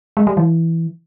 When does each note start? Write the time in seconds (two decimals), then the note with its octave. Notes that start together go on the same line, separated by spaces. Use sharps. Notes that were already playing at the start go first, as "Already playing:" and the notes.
0.17 G#3
0.27 G3
0.37 E3